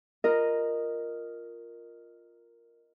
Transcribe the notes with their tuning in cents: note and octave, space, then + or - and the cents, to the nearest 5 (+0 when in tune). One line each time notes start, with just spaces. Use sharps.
F4 +0 A#4 +0 D#5 -10